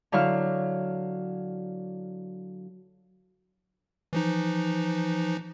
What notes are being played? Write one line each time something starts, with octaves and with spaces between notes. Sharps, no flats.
D3 F#3 E4 F5 C#6 F6
E3 F3 D#4